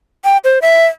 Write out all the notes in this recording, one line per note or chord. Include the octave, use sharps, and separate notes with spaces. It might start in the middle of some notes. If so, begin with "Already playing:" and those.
G5
C5
E5